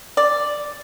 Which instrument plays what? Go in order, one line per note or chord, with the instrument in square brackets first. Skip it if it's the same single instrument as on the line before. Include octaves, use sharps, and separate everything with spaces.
[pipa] D5